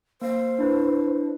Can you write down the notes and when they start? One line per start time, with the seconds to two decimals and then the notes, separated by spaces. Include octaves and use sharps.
0.22 A#3 C5 F5
0.59 D4 E4 B4